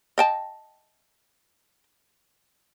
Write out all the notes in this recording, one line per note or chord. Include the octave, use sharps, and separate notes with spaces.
D#5 G5 A5